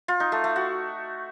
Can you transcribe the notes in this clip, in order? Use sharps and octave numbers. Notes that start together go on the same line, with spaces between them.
F4
D#4
A3
A3
F#4